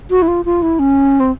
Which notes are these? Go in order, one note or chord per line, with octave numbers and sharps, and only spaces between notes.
F#4
E4
F4
F4
E4
C#4
C4